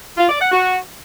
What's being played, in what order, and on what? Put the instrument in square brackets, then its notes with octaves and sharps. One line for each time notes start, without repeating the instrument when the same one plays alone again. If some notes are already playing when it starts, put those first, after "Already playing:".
[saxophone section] F4
D5
F#5
F#4